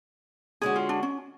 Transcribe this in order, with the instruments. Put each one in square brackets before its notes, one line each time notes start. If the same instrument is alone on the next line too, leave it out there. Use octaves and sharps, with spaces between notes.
[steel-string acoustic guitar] D3 G#3 C#4 F#4 [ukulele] G#4
[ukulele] F4
D4
C#4